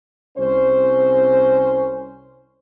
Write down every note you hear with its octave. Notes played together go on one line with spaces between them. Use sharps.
C2 C#4 C5